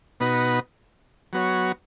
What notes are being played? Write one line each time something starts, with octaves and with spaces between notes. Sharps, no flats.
B2 B3 D#4 F#4 B4
F#3 B3 F#4 C#5